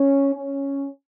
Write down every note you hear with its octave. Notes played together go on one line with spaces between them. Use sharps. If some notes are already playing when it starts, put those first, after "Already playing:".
Already playing: C#4
C#4